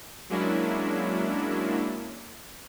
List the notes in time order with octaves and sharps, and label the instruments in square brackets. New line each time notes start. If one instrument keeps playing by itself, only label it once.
[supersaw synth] F#3 G#3 A#3 C#4 D4 E4